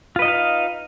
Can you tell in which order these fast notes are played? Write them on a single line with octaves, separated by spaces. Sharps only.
F4 B4 D#5 D#4 F5